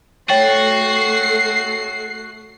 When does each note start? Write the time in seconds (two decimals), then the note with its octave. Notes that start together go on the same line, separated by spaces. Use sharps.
0.29 A3 F#4 C#5 G5 A6 C7